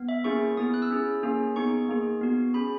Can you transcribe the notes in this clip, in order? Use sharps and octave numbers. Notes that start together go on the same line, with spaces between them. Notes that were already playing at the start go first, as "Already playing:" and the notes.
Already playing: B3
E5
A#3 C#4 E4 G#4 C#6
B3 E4 G#4 D#6
F#6
E6
C#4 E4 G#4
A#3 C#4 G#4
B3 D#4 G#4 C#6
A#3 D#4 G#4
B3 F#4
C#4 G#4 B5